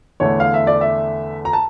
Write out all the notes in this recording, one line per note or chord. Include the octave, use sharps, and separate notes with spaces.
E2 D3 A3 C#5
F5
E5
D5
E5
A#5
A5